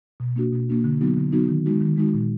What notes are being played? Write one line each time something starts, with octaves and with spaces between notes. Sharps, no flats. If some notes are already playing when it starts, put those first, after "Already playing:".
B2
A#3 D4 F#4
B2
A#3 D4 F#4
D3
F#3 B3 D#4 F#4
D3
F#3 B3 D#4 F#4
D#3
G#3 D#4 F#4
D#3
G#3 D#4 F#4
A#2